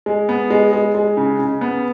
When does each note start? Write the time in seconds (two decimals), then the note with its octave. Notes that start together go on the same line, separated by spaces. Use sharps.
0.06 G#3
0.29 B3
0.50 G#3
0.73 G#3
0.95 G#3
1.17 C#3
1.39 C#3
1.61 B3